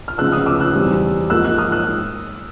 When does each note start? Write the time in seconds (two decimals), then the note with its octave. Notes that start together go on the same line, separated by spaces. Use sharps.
0.08 F6
0.18 D2 C#3 F3 G#3 B3 E6 F#6
0.32 D#6 F6
0.46 D6 E6
0.60 E6 F#6
0.75 E2 B2 G3 C4
1.30 G#2 F3 A#3 E6 F#6
1.45 E6 F#6
1.58 D#6 F6
1.72 E6 F#6